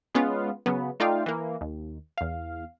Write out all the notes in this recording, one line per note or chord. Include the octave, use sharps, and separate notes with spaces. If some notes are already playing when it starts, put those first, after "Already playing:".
G#3 B3 C#4 F4
C#3 F#3 B3
A3 D#4 F4 D5 F5 G5
E3 A#3
D#2
E2 F5